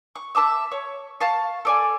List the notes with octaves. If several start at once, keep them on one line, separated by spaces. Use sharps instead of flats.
C#6
E5 A5 D6 E6
C#5
F5 A5 C#6
A4 D5 G#5